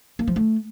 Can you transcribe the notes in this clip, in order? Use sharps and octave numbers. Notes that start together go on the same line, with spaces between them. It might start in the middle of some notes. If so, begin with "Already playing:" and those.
A#3
F3
A3